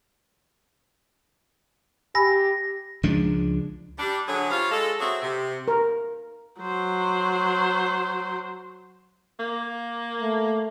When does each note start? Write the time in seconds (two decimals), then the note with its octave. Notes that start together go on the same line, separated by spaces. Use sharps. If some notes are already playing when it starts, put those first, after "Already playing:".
2.15 G4 G#5 B5 E6 A#6
3.03 C#2 F3 G#3 D4
3.99 G3 D4
4.28 D3 F#3 G#4
4.50 G3 F4 C5 C#5 F5
4.71 G#3 A4
5.00 F#3 C4 F#4 G#4 C5 E5
5.22 C3
5.68 A#4
6.61 F#3 C5
9.39 A#3
10.21 A3